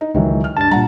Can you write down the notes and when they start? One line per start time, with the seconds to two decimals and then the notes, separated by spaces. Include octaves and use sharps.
0.01 D#4
0.15 C#2 D#3 E3 F#3
0.44 F6
0.57 G2 D4 A5 A6
0.71 A#2 G3 F#5 A#5